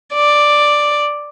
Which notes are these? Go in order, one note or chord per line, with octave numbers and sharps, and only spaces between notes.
D5